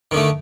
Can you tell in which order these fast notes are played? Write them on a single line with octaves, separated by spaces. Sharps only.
D#3 D3 A3